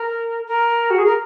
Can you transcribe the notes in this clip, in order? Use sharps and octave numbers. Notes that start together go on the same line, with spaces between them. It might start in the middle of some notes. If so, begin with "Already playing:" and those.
Already playing: A#4
A#4
F#4
G#4
A#4